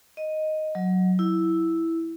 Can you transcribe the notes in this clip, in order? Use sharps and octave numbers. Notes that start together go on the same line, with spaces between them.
D#5
F#3
E4